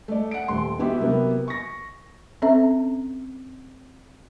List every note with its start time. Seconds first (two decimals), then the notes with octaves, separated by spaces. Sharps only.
0.08 A3 D5
0.31 F#5 D7
0.48 D#1 A3 C6
0.79 B3 E4 F#4 G4
0.98 C3 F#3 A#3 B3
1.48 C#6 A#6
2.42 C4 C#4 A4 E5